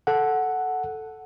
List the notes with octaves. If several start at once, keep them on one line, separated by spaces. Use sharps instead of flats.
A4 F#5